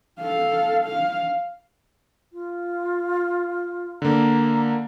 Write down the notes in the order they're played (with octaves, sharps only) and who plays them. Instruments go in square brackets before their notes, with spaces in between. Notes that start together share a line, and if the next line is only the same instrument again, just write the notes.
[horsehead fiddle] A4 F5
F5
[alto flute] F4
[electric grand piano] D3 A#3 [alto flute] A#5